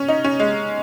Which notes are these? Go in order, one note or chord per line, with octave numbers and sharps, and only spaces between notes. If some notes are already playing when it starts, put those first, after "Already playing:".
Already playing: C#4
D#4
C#4
G#3